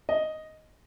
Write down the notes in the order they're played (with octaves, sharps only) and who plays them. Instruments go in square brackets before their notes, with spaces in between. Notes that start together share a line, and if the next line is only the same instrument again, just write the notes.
[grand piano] D#5